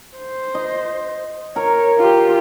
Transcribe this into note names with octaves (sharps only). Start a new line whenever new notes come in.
C5
D#5
A#4 C#5
F4 G4